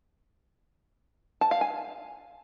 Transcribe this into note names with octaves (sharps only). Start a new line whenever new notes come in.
A5
F5
G#5